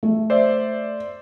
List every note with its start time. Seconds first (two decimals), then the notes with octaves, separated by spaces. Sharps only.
0.03 A3
0.30 C5 D5 E5